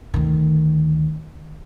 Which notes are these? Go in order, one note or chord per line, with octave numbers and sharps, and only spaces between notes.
D2 D#3